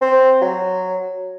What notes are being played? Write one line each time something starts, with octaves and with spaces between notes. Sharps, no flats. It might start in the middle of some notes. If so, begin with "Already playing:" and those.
C4
F#3